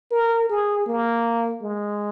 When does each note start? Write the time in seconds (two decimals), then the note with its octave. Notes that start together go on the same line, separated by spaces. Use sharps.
0.12 A#4
0.50 G#4
0.86 A#3
1.62 G#3